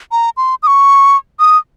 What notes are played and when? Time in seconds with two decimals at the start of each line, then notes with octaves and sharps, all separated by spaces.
0.12 A#5
0.37 C6
0.63 D#6
0.67 C#6
1.40 D#6